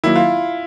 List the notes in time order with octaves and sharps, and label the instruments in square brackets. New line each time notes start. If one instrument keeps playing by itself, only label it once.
[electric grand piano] D#3 F#3 A#3 D#4 [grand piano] E4
[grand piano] F4